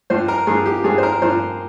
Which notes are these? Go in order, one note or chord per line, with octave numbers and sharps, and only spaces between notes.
G2 F3 C5
A#4
G2 F3 G#4
G4
G2 F3 G#4
C5
A#4
G2 F3 C5